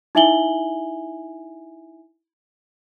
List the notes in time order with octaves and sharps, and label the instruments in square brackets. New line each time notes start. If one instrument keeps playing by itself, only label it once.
[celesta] D#4 E4 E5 G#5 F#7 G7